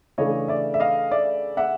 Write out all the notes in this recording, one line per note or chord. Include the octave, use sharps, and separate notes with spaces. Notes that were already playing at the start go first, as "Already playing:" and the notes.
C#3 E3 A3 D4 C#5 D#5
D5 E5
E5
D#5 F5
D5 E5
E5 F#5